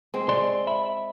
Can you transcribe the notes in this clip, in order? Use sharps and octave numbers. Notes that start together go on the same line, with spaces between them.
G#3 C4
D5 C6
E5 B5